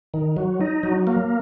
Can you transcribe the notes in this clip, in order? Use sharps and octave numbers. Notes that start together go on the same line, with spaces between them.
D#3
F#3
D#4
F#3
A#3